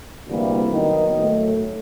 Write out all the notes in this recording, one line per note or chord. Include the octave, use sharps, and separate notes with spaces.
D2 C3 E3 G3 A#3
D#3 F#3 B3 D#4
A2 F#3 A3